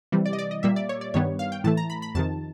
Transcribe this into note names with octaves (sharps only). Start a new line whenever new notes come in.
C3 E3 G3
D5
D#5
D5
D#5
A#2 G3 A#3 E5
D5
C#5
D5
G2 D#3 G3 B3 C#5
F5
G5
A2 E3 A3 A5
A#5
B5
B5
F2 C3 D#3 A5